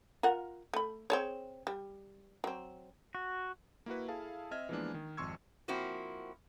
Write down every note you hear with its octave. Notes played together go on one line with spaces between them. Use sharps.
F4 A#4 F#5
A3 B5
C4 G#4 C#5
G3
F#3 C4
F#4
A#3 E4 F#4 B4
E4 G#4 A4 F5 A5
C4 D#5 E5 F6 G#6
E3 F3 G#3 A#3 B3 D4
D#3
G#1 F2 C6 C#6 E6 G#6
F3 A#3 C4 E4 F#4